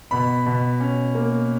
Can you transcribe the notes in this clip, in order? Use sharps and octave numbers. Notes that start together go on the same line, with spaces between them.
B2 B5
B2
C#4
A#3